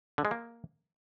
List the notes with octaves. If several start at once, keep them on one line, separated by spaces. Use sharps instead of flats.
D3
G#3
A#3